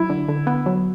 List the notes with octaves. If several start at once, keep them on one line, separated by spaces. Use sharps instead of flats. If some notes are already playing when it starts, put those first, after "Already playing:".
Already playing: F#3 E4
D3
D3
B3
F#3